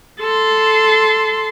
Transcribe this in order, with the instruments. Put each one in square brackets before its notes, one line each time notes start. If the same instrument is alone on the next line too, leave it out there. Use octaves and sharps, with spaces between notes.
[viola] A4 C6